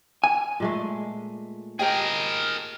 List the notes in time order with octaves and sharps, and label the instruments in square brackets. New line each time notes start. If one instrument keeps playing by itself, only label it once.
[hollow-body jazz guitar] G#5
[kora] A#2 G#3 A3
[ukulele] G4 D#5 G5 [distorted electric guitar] G#4 A#4